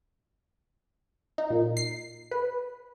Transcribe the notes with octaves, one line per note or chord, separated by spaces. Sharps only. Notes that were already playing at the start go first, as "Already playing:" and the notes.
D#4
A#2
C7
B4